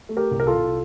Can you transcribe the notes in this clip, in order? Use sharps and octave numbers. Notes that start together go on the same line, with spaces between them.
A3
G4 A#4
C2
A#4
F4 A4
C2